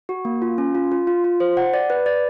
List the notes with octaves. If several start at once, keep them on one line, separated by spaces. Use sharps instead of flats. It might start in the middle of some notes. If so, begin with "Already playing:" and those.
F#4
A#3
F4
C#4
F4
F4
F4
F4
C5
F#5
D5
B4
D5